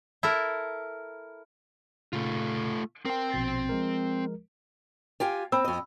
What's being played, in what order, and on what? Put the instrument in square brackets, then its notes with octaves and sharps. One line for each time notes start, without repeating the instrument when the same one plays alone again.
[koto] E4 A4 A#4
[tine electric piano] A#2 C#3 [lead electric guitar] A3 F4
[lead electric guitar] C4 G5 [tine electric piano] A#4
[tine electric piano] A#1 B2 A6
F3 G#3 A#4
[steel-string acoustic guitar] F4 G4 G#5
[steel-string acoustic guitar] C4 [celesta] B5 E6
[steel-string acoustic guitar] F2 D#5